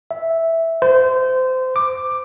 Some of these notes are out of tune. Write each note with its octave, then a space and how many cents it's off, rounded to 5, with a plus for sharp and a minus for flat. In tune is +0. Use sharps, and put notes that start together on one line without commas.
E5 -5
C5 -25
D6 +10